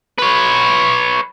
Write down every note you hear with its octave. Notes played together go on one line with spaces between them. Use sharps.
B4 C#5